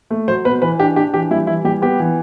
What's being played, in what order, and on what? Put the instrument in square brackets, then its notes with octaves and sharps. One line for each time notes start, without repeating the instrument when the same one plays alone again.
[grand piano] A3
F#3 C5
B2 B4
E3 B4
D4 G4
D4 G4
E3 G4
G3 E4
E3 E4
G3 G4
B3 G4
E3